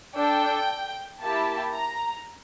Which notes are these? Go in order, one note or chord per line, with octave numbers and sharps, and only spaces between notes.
D4 A4 G5
A#3 E4 G4 A5
A#5